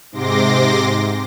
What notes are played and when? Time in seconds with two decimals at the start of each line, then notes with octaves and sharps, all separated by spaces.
0.12 G#2 C3 C6 D6 A#6